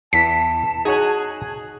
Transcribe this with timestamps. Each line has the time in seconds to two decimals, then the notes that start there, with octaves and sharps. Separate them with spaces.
0.13 E2 E3 A5 B6
0.85 D#4 F#4 G#4 C#5 F#6